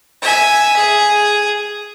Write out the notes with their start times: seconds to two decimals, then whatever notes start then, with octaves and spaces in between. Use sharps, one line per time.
0.22 E5 G#5
0.77 G#4